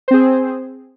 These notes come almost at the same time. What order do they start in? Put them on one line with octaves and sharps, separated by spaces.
C5 C4 G#4